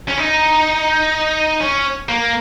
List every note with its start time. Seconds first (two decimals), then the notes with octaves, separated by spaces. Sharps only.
0.08 C#4
0.18 D#4
1.60 C#4
2.09 A#3